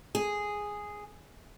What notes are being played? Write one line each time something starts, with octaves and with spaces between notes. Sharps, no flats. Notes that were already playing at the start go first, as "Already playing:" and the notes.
G#4